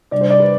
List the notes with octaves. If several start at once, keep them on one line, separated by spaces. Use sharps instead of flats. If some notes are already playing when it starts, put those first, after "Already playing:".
C3 G3 D4 D5
C5
D5
B4